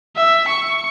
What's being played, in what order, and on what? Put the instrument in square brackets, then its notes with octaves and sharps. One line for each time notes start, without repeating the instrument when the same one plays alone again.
[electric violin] E5
C#6